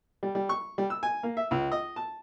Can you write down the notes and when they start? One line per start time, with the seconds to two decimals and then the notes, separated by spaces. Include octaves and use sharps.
0.23 G3
0.35 G3
0.49 C#6
0.78 G3
0.90 E6
1.03 G#5
1.23 A#3
1.37 E5
1.51 C#2
1.72 D#5
1.96 A5